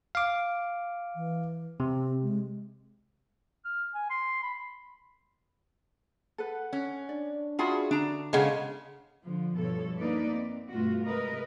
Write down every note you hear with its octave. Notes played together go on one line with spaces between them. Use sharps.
F5 D6
E3
C3 C4
G#3
F6
G#5
C6
B5
A4 B4 F#5
C#4
D4 D5
F4 F#4 G#4 E5 A5 B5
D3 D4 A#5
C#3 G#3 A4 F5 F#5
D3 F3
G2 B2 F3 A4 C#5
A#3 D4 D#4 B4 D5
C4
G2 B2 A3 F4 F#4
C3 G#3 A#4 B4 D#5